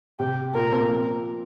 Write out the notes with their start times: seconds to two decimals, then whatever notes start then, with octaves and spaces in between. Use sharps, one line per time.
0.19 C3 G4
0.55 A#2 A#4
0.63 A#3
0.72 C4
0.81 A#3
0.90 F3